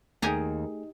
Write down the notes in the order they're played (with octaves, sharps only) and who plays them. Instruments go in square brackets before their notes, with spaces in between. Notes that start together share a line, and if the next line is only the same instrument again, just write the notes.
[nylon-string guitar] D#2 [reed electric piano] A3 G#4 [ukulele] D4 D#4 [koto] G4 G#5 A#5